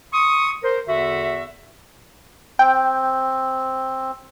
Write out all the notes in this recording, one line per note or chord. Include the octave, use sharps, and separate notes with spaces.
C6 C#6 D#6
A#4 C5
E2 D3 F#4 E5
C4 G5